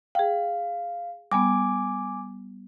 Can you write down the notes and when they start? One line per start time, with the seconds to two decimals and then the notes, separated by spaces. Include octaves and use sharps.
0.15 G#4 F5 G5
1.32 G3 B3 G#5 D6